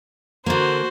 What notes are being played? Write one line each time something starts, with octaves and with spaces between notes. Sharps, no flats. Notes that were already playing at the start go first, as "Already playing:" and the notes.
D3 A#3 F#4 C5